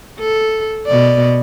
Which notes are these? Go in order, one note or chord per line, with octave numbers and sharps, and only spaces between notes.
A4
B2 D5